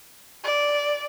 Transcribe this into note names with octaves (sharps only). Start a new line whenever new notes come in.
D5